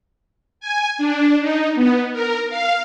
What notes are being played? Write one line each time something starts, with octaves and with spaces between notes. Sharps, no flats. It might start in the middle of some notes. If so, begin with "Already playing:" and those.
G#5
D4
D#4
B3
A#4
F5